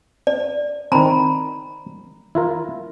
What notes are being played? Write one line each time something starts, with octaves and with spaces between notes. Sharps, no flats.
D5
D#3 C4 A#5 B5
E4 F4 A#4